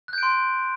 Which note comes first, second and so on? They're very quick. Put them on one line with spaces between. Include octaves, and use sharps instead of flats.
F#6 G6 D7 C6